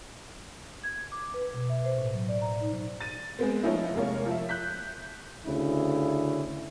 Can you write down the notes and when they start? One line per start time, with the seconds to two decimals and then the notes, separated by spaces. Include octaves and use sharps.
0.84 G#6
1.12 D6
1.34 B4
1.54 B2
1.69 E5
1.85 C5
1.98 A2
2.14 F#3
2.29 D5
2.42 A#5
2.61 D#4
3.01 A6 D#7
3.39 G#3 B3 C4
3.63 F3 A3 C#4 D#4 E4
3.94 F1 G#3 A#3 A#4 C#5
4.26 F3 E5
4.49 F#6 G6 B6
5.46 D2 C#3 E4